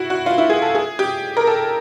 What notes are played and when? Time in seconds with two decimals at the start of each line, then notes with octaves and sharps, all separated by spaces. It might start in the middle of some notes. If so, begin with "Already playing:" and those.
Already playing: E4 F#4
0.10 F#4
0.26 F4
0.38 E4
0.50 G#4
0.62 A4
0.75 G#4
0.99 G4
1.37 A#4
1.47 A4